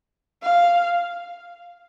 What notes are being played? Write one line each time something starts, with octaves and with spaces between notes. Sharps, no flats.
F5